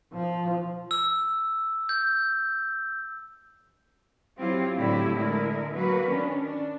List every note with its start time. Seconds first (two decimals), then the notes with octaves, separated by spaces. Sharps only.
0.13 F3
0.91 E6
1.89 G6
4.39 F#3 C4 E4 F4 G4
4.77 A2 D3 F#3 E4 G4
5.16 D3 G#3 E4 A#4
5.74 F#3 A#3 F#4 B4
6.08 D#3 C#4 D4
6.42 D4